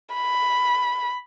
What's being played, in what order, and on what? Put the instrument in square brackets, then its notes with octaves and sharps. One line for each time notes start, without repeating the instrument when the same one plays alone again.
[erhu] B5